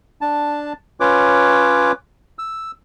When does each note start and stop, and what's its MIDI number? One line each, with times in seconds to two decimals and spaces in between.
0.21 0.73 62
0.21 0.73 81
1.00 1.92 61
1.00 1.92 65
1.00 1.92 71
1.00 1.92 73
1.00 1.92 86
2.39 2.71 88